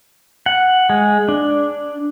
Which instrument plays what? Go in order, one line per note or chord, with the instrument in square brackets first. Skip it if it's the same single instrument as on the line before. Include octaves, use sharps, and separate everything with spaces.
[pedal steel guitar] F#5
G#3
D4